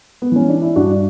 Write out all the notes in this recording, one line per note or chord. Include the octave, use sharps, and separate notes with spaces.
B3
E3 C#4
D4
E4
G2 D4 F#4